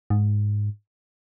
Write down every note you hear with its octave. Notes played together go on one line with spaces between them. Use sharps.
G#2